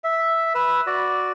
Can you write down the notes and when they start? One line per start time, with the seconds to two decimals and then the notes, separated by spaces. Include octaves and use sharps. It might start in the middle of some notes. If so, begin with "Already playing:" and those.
0.04 E5
0.55 B4 E6
0.87 F#4 D5